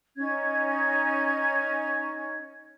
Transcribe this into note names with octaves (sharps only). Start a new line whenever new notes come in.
C#4 D#4 G#6